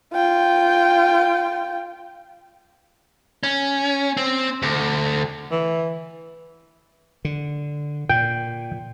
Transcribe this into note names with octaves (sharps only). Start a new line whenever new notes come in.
F4 G5
C#4
C4
D2
E3
D3
A#2 G5